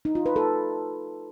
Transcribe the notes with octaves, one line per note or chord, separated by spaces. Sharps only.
D#4
F4
B4
A4